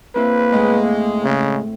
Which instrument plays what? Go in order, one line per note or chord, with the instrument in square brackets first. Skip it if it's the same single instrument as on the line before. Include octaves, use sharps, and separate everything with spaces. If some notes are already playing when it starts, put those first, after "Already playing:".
[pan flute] A#3 [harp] C4 E4 A#4 [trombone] B4
[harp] A2 [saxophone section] G#3
[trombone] C#3